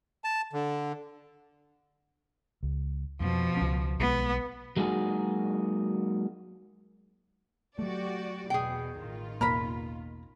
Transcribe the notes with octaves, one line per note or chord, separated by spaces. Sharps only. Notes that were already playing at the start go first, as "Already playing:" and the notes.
A5
D3
C#2
F2 B2 F3
C#2 C#4
B1 G#3 B3
F#3 G#3 A#3 D#4 F#4 G#4
F#3 A3 F#4 G4 D5
E2 B2 G#4 G5
A1 D#3 F4
E2 B2 A#3 A#4 A#5 B5